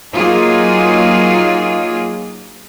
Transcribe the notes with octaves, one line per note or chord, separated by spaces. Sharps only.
F#3 A#3 D#4 F4 G#4